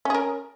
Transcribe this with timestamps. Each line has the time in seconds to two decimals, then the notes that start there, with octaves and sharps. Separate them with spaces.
0.05 C#4
0.10 G#4
0.14 A#4